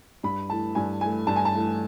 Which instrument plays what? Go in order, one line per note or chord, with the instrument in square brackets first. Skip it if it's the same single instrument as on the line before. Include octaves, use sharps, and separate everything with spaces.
[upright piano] G2 B5
E3 A3 A5
G2 G#5
E3 A3 G#5
G2 A5
G#5
A5
E3 A3